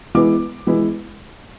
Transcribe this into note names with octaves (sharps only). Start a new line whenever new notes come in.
E3 G#3 B3 E4 D6
E3 G#3 B3 E4